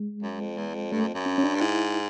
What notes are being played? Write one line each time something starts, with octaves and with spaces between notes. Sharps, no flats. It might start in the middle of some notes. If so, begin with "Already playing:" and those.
Already playing: G#3
F#2
F2
E2
F2
G2 A3
F#2
F2
F#2
C#4
C#4
D4
G2
G#2 E4